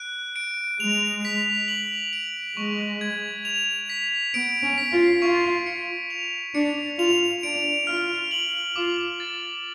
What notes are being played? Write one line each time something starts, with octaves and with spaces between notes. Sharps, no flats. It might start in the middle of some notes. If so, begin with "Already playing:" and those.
Already playing: F#6 D7
D7
G#3 F7
B6
F#7
D7
G#3 C#6
G#6
F7
B6
B3 D7
C#4
B6
F4
F4 C#6
C#7
F7
D4 C#7
F4 F7
D4 D7
F4 F6
F#7
F4 D6
A6